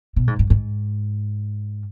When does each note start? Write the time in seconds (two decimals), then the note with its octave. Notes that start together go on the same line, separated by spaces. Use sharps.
0.16 B2
0.27 G#2
0.39 G#2
0.50 G#2